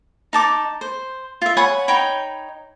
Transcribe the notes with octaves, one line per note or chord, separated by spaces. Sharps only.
D#4 A5 D6
C5
F4 E5
C#5 F#5 G#5 B5
D#4 C#5 G5 B5